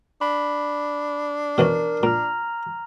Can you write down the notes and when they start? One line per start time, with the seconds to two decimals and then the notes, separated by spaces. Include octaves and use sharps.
0.21 D4 B5
1.58 B2 E3 C#4 A#4
2.03 A#2 A#5 F6